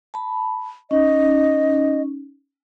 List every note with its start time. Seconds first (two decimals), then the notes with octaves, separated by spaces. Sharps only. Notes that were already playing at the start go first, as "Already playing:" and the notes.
0.14 A5 B5
0.91 C#4 D#4 D#5